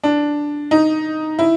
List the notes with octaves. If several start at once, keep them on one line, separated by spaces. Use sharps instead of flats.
D4
D#4
E4